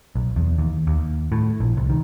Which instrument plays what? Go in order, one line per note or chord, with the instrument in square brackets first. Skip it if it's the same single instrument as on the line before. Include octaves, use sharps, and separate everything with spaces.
[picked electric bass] B1
E2
D#2
D#2
A2
A#1
C2
D#3